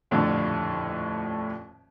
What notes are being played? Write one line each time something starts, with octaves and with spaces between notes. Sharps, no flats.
D#1 F2 A2 D3 D5